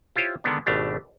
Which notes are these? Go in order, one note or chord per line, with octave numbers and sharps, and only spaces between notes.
E4 F4 G4 C5 C#5
D3 D#3 G#3 B3 D4
G#1 B2 A3 D4 G4